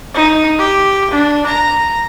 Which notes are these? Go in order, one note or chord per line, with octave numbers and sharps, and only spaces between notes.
D#4
G4
D4
A#5